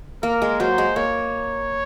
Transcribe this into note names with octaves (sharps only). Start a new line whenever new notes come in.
A#3 A#4
G#3
F#3 C5
G#3
A#3 C#5